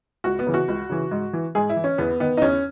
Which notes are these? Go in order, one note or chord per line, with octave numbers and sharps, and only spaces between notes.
C#2 F#4
B3
C#3 E3
F#4
C#2
C#3 E3
G#2
E3
G#2 G#4
E4
E3
C#4
E2 B3
D#3 B3
D#4
E2 C#4